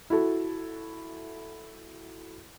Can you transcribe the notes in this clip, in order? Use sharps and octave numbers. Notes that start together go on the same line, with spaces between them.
E4 F#4 A4